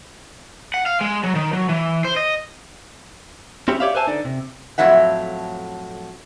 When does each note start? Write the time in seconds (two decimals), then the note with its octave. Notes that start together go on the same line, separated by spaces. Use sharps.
0.74 F#5
0.86 F5
1.01 G#3
1.24 F#3
1.35 D#3
1.53 F#3
1.69 E3
2.05 C5
2.16 D#5
3.68 C4 C#4 E4 G4
3.80 G4 C#5 D5 E5 F5
3.95 B4 C5 E5 G#5 A5
4.07 D3 D#4 D5
4.25 C3
4.78 F2 A2 F#3 E5 F#5